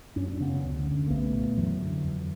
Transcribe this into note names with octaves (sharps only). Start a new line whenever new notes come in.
F#2 C#4
D4
C#3 B3 C#4
D2
D3
A#3
C2 A3 B3
A#2
F#2 E3 F#3
D3
F2